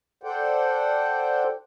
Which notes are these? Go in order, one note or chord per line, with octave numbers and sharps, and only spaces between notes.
A4 C5 D5 F#5 G5